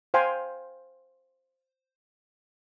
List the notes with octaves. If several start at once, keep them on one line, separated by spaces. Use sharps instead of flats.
C5 F5 G5 G#5 C6